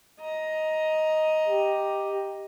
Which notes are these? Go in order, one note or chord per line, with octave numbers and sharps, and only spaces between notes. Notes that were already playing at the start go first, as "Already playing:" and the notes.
D#5 A#5
G4